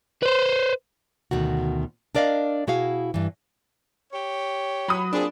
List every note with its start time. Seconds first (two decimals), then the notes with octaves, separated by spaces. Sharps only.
0.23 B4 C5
1.31 D2 B2 D#3 F#4
2.15 D4 A#4 D5 D#5 F5
2.67 B2 E4 F#4 G#4 F5
3.14 G2 E3
4.12 G4 C#5
4.88 F#3 B5 D#6
5.13 A#2 C4 D4 G#4